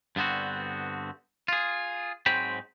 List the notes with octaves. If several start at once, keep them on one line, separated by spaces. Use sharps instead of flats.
G2 D3 B3 C4 F#4
F4 G#4
G#2 F#3 G#3 C4 G5 B5